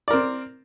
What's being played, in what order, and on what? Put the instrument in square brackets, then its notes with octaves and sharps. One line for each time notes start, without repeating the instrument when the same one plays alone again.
[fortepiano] D5
A#4
C4